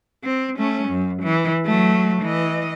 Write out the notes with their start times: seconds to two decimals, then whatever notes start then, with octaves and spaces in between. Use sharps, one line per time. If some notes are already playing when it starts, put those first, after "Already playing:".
0.23 C4
0.58 A3 C#4
0.89 F#2
1.22 E3
1.65 F#3 A3
2.22 E3 D#5